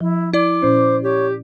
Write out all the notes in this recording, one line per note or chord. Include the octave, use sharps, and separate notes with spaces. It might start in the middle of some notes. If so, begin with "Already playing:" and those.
F3 E4
E4 D5 D6
A#2 C#4 C5
G4 C#5